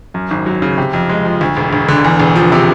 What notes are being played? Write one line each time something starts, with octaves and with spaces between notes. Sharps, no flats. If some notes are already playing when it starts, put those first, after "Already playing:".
F#2
G#1
F#3
C#3
C3
F2
G#3
F3
D2
E1
E1
D3
E2
E1
F3
C3